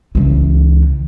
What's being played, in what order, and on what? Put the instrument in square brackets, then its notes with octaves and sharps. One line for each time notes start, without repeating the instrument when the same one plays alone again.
[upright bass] C#2 E3